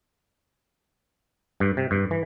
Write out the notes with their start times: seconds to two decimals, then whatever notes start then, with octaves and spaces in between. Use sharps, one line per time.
1.60 G2
1.77 C3
1.91 G2
2.11 E3